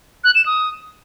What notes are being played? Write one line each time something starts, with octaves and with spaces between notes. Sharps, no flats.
F#6
E7
D#6